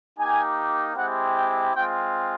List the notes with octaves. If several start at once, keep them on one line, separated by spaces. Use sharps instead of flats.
A#3 D#4 G4 G#5
G#3 C4 E4 G4 F#5
G5
G#3 C4 F4 G5